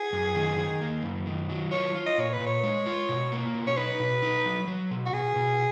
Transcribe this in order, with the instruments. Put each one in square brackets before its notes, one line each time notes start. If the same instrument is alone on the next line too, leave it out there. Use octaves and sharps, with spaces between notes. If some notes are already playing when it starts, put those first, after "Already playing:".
Already playing: [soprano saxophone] G#4
[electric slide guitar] F#2
D#3
D#3
A#3
F#2
D#3
F#3
[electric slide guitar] F4 [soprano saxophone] C#5
[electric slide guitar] F4
[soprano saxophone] D#5
[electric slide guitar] A#2 [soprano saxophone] C#5
[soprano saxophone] B4
[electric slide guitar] A#2
[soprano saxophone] C#5
[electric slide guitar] G#3
F4
B2
A#3
B2
[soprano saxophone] C#5
[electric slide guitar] D#4 [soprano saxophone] B4
[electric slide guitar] B2
D#4
F#3
F#3
B2
[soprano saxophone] F#4
[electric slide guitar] B2 [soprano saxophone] G#4
[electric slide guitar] B2